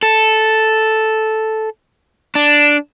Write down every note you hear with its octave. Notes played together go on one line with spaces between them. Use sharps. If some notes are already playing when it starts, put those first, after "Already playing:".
A4
D4